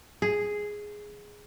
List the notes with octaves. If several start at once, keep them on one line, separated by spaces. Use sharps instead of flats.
G#4